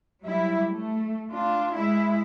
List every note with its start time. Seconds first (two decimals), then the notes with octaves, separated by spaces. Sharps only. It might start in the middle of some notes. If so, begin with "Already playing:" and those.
0.23 F#3 G3 E4
0.70 A3
1.30 D4 F4
1.75 G#3 E4